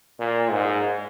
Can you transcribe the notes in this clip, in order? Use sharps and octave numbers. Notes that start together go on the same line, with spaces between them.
A#2
G#2